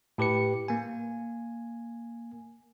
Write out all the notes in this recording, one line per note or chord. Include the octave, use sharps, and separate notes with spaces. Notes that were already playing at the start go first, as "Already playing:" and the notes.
A2 G4 B4 C#7
A#3 G#5